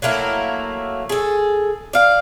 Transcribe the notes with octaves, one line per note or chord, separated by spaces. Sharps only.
F#3 A3 A#3 E4
G#4 A4
D5 F5